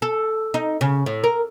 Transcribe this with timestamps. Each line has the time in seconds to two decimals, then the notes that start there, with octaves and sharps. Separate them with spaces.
0.02 A4
0.54 D#4
0.81 C#3
1.06 A2
1.24 A#4